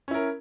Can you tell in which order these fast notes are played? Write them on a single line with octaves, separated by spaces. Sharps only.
C#4 E4 A#4